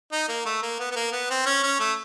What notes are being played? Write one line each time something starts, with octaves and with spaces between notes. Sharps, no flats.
D#4
A#3
A3
A#3
B3
B3
A#3
B3
C4
C#4
C#4
A3